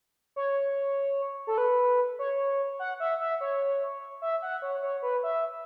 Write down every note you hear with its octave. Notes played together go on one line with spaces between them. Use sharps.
C#5
A4
B4
C#5
F#5
E5
E5
C#5
E5
F#5
C#5
C#5
B4
E5